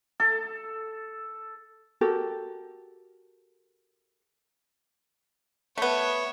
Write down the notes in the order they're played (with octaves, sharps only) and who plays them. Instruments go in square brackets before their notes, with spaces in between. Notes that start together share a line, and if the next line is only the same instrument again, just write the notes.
[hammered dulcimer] A4
[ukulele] F#4 G4 A4 A#4
[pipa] A3 B3 [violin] C#5 E5